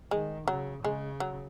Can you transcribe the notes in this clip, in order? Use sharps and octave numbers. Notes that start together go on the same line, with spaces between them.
D#3 G#3
C#3 F#3
C#3 G#3
F#3